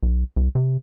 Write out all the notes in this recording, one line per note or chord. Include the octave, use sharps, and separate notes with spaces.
B1
C2
C3